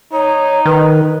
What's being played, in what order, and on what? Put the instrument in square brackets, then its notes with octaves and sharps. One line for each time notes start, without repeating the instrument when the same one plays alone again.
[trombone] D#4 [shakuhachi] C#5
[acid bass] D#3 [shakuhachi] B4